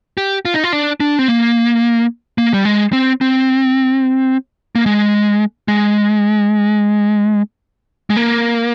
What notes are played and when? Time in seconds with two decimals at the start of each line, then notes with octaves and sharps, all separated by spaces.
0.17 G4
0.45 F4
0.54 D#4
0.64 F4
0.73 D4
1.00 D4
1.19 C4
1.28 A#3
2.38 A#3
2.54 G3
2.65 G#3
2.93 C4
3.21 C4
4.75 A#3
4.86 G#3
5.68 G#3
8.10 G#3
8.17 A#3